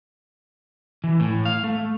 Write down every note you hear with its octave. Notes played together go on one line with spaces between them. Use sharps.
E3
A2
F5
A3